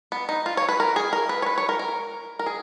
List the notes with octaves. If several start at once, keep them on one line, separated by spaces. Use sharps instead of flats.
B3
D#4
F4
C#5
B4
A#4
G#4
A#4
B4
C#5
B4
C#5
A#4
A#4
A#4
G#4